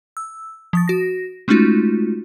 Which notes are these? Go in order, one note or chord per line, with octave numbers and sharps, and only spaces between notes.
E6
F3 D#6 A6
F#4 A#6
G#3 A3 C#4 D#4 F4 F#4